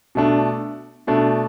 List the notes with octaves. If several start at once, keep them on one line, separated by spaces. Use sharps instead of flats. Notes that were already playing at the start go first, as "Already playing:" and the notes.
B2 A3 D4
B2 A3 D4